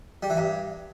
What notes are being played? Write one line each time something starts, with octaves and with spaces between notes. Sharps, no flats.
G3
E3
G2